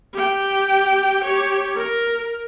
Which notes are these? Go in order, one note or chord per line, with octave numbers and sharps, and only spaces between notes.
G4 G5
G4 C#5
A#4